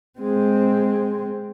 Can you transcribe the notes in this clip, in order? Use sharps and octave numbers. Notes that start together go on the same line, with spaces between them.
G#3 C4